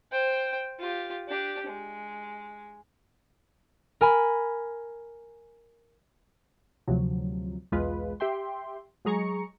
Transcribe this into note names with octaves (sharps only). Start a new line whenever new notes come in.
C5 G5
F4 G4
D4 G4
G#3
A#4 G#5 B5
D2 C3 F3 F#3
B1 E2 G#3 F4 B4
G4 E5 G5 C6
F#3 G#3 G#4 A#5 C#6 C#7